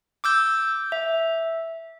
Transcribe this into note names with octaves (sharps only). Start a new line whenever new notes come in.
D6 E6 G6
E5